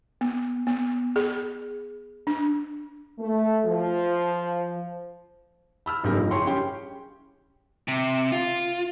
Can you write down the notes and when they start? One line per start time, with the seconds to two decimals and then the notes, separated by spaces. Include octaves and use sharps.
0.21 B3
0.67 B3
1.16 G#4
2.27 D4
3.19 A3
3.66 F3
5.86 B5 E6 F6
6.04 F#1 B1 C#4 G4 A#4
6.17 F3
6.31 E4 G#4 C#5 G5 C6 C#6
6.46 C#4 G4 G5 C6
7.88 C3
8.32 F4